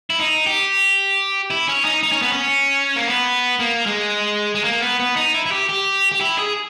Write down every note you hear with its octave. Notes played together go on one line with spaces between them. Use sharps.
E4
D#4
G4
E4
C#4
D#4
D#4
C#4
B3
C#4
A#3
B3
A#3
G#3
G#3
A#3
B3
B3
D#4
E4
E4
G4
G4
G4
E4
G#4